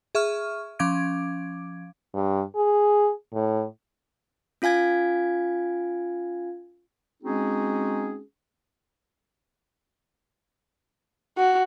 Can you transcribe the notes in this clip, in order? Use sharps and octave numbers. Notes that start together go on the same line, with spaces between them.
G#4 E5 C#6 F6
F3 C#4 F5 D6 G#6 D7
G2
G#4
A2
C#4 F4 F5 G#5 G#6
G#3 C4 C#4 D#4 F#4 G#4
F#4